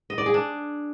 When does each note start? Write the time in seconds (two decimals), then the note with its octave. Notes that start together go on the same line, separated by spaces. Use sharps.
0.10 D#5
0.18 D5
0.26 G#4
0.34 D4